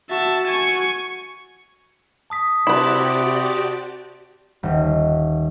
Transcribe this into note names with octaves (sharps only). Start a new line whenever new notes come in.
F#4 E5 A5
G#5 C#6
A5 D#6 B6
C3 E4 F#4 G4 B4 D5 C6
D#1